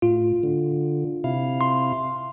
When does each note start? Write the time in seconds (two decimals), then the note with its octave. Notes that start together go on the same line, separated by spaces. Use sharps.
0.02 A2 F4
0.43 D3
1.24 C3 E4 F5
1.61 C6